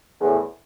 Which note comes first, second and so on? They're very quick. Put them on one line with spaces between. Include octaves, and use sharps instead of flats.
E2 E3 A2